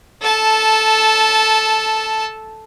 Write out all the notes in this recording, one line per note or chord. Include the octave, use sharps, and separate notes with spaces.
A4 A5